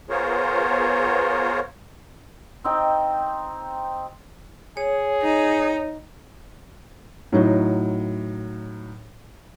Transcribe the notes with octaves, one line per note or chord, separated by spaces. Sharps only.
B3 F4 G#4 A#4 C5 C#5
C4 D#4 G5
G#4 C#5
D#4
A2 F#3 D#4 F#4